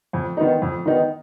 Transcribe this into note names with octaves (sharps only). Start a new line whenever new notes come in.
F2
D#3 B3 D#4
F2
D#3 B3 D#4